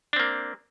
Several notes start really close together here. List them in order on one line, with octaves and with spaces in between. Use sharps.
D4 C4 A#3